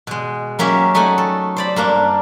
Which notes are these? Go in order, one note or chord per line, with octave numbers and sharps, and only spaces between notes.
B2 G#3
F#3 A#3 C#4 G4 E5
A3 D#4 D#5 F#5 G#5
A4
C5 D5 B5
G2 A#3 D4